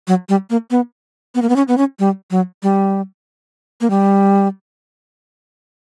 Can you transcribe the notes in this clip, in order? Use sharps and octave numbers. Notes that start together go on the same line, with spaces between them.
F#3
G3
A#3
B3
B3
A#3
B3
C#4
B3
C#4
G3
F#3
G3
A#3
G3